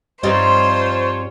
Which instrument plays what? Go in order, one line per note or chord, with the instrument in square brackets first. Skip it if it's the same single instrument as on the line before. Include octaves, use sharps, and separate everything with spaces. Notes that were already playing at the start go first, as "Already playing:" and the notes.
[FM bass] G2 [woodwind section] F3 F4 C#5 [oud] G3 C4 D#4 [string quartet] C5